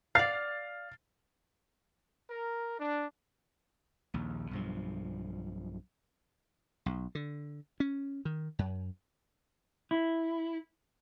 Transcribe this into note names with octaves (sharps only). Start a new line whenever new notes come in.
D5 F5 F6 A6 C7
A#4
D4
A#1 D#2
B1 G2 F3
B1
D3
C#4
D#3
F#2
E4